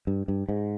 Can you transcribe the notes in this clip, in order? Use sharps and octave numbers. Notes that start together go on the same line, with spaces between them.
G2
G2
G#2